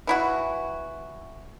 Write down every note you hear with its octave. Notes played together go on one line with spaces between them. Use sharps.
E3 E4 F#4